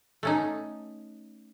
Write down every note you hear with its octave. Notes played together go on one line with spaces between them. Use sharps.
A3 C#4 D#4